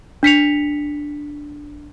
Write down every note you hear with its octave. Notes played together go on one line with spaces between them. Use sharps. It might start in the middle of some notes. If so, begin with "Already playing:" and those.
D4 B6 C#7 F7